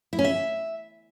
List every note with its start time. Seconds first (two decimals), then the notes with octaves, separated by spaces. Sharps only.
0.13 E4
0.19 C#4
0.25 E5